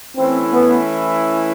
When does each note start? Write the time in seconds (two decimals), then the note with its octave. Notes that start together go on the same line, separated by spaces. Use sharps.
0.17 E3 A3 C4 C#4 E4
0.52 B3